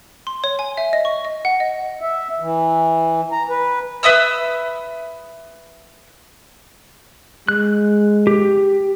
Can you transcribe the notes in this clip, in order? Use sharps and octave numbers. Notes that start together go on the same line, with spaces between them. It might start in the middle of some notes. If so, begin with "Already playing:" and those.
C6
C#5
G#5
E5
D#5
C#6
D#5
F#5
D#5
E5
E3
A#5
B4
B4 E5 D#6 E6
G#3 F#6
G4